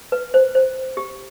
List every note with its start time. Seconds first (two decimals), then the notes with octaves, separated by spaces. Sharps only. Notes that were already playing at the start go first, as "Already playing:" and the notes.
0.12 B4
0.34 C5
0.55 C5
0.97 G4